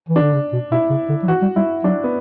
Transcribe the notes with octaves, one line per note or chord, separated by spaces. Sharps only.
E3
D4
D3
C#3
B2
B2 E4
C#3
D3
F#3
E3 F#4
G3
G3 E4
F#3 D4
B3